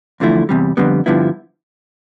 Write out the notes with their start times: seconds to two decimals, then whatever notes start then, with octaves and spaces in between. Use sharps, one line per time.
0.20 E2 D3 F3 A3 E4
0.49 E2 C3 G3
0.77 F2 D3 G3 B3
1.06 G2 D3 F3 B3 E4